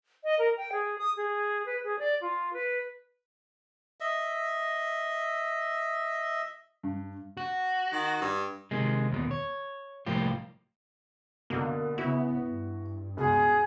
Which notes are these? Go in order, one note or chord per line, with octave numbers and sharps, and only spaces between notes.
D#5
A#4
G5
G#4
D#6
G#4
B4
G#4
D5
F4
B4
D#5 E5
G2
F#4
D#3
G2
C3 D#3 G#3
D#2 B2
C#5
C2 A2 F3 A#3 G4
B2 D3 A#3
C#3 B3 E4 F#4
G2
C#2 B2 G#4